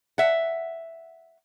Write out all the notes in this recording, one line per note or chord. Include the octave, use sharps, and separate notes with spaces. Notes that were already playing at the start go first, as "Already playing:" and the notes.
E5 F#5